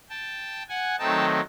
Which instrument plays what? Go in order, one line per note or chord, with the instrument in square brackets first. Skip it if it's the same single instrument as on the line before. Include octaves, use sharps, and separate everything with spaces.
[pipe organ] G5 A5
F#5 G#5
D#3 F#3 A3 C4 D#4 G5 A5